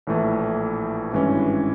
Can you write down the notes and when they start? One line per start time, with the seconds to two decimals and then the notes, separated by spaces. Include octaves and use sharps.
0.07 A#1 A2 E3 A3
1.12 G#1 G2 E3 G#3 C#4